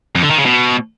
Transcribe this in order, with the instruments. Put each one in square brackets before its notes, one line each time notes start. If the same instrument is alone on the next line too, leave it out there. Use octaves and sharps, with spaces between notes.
[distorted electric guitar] F2
D3
D#3
C#3
B2